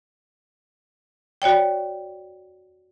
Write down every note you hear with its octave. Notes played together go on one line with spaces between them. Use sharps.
F#4 C#5 D5 G5